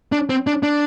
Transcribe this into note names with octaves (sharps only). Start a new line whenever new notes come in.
D4
C4
D4
D4